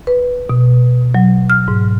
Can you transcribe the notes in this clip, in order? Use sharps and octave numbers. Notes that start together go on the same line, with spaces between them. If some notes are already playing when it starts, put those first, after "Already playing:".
B4
B2
F#3
F6
G#2